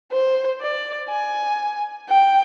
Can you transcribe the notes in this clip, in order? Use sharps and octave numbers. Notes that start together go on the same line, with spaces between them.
C5
D5
G#5
G5